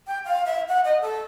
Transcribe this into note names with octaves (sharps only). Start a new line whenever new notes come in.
G5
F5
E5
F#5
D#5
A4